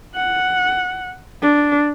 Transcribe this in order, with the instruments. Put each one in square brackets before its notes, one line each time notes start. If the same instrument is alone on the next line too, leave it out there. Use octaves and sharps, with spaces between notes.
[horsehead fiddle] F#5
D4